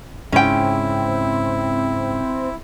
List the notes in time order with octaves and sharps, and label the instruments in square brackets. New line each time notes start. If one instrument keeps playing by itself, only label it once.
[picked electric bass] G#2 C#3 [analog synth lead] C4 [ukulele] C#4 G5 [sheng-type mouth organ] E4